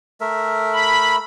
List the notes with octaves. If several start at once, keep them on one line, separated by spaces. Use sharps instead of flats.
A3 A#4 E5
B5